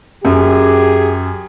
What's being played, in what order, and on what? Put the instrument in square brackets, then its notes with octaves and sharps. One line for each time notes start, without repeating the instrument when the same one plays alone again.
[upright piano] F#2 [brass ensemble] G4 G#4